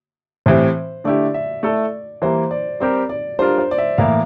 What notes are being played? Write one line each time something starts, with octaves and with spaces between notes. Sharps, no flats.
A2 E3 G3 C4 C5
D3 A3 E4 G4 D5
E5
A3 E4 A4 D5
E3 G3 A#3 C5
D5
G3 C4 G4 A#4 D5
D5
G3 D4 F4 A#4 C5
C5
D5
E5
A2 E3 A#3 E4 F5